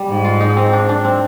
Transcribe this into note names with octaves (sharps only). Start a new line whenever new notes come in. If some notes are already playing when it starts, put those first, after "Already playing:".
Already playing: G3
G#2
F4
D#4
C4
D4
D4
C4